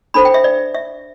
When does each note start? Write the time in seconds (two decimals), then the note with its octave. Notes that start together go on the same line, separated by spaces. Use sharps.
0.14 D4 A4 C5 B5
0.25 G5
0.34 E5
0.44 D5
0.75 E5